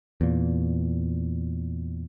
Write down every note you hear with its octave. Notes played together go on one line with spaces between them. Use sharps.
E2 A#2